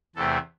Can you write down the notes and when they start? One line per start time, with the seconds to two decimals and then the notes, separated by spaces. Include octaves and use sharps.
0.16 E2 C3 A3 C4 A4